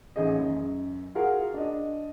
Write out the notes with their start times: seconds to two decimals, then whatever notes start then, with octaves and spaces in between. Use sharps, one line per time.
0.16 A1 D#4 G#4 D#5
0.39 F#2
1.15 F4 F#4 G#4 A#4 F#5
1.54 D4 D#5